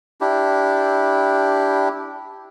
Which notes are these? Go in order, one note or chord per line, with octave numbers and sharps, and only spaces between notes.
D4 E4 G4